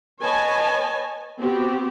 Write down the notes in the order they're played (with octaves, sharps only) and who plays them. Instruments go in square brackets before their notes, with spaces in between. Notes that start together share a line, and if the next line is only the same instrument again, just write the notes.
[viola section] B4 C#5 D#5 G#5 A5
B3 C4 F#4 G4